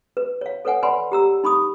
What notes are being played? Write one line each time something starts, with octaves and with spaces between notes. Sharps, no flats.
B4
C#5 F5
A4 B4 C#5 F#5 G#5
B4 D5 F#5 G#5 B5 C6
G4 A#5 E6
D#4 B5 C#6 D#6